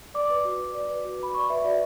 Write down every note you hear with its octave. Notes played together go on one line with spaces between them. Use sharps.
D5 D6
B4
F#4
F#4
D5
B4
F#4
F#4 B5
D5 C#6
B4 E5
F#4 D5